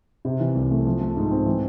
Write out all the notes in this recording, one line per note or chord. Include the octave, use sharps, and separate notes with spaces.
C3
E3
C2
A3
F3
A3
G#2
C4
E3